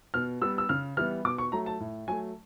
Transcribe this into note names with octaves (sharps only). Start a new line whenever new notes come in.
B2 F6
G3 B3 E6
E6
C#3 F6
E3 G3 B3 F6
B2 D6
C#6
F#3 A3 A#5
A5
A2
F#3 A3 G#5